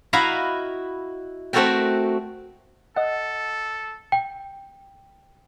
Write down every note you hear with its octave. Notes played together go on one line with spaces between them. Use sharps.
E4 F#4 D#5 F5 A#5 B5
A3 C4 F#4 A4 A#4 G5
A4 D#5 F#5
G5